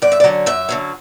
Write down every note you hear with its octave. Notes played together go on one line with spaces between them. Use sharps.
F#2 D5
E5
D5
D3 F#3 C#4
F#2 E5
D3 F#3 C#4